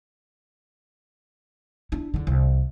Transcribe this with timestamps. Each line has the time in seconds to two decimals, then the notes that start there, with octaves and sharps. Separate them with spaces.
1.92 D4 E4
2.14 E2 D3
2.27 C2